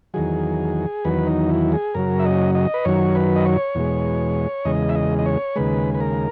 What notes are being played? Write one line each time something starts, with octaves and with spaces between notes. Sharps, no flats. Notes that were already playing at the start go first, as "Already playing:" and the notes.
E2 D#3 F#3 G#4
E2 D#3 F#3 B4
D#4
E4
G#4
F#2 C#3 F#3 A#4
E5
D#5
D#5
B4
F#2 D#3 F#3 C#5
B4
D#5
C#5
E2 B2 G#3
E2 C#3 G#3 D#5
E5
D#5
D#5
C#5
D#2 C#3 G#3 B4
B4
A#4